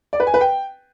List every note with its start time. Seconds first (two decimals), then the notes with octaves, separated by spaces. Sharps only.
0.13 D5
0.20 B4
0.27 G#5
0.34 B4
0.41 G5